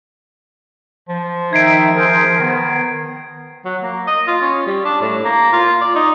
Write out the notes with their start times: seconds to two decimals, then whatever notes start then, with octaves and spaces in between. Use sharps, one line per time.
1.09 F3
1.53 D#3 D#4 E5 G#6 C7 D7
1.96 G#4 A#4 C5
2.40 D#3 B3
3.65 F#3
3.83 A#3
4.07 D#5
4.28 F4
4.41 C#4
4.67 G3
4.85 D4
5.01 A2
5.25 A#3
5.53 F4
5.81 D5
5.95 D#4